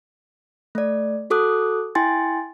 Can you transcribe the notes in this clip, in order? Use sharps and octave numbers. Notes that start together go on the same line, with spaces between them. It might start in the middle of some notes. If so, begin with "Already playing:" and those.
A3 D5
F#4 A4 D6 D#6 F#6
E4 G5 G#5 C6 A6